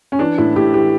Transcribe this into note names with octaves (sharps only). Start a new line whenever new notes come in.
C#4
E3 D4
A2 E4
A2 G4
E3 G4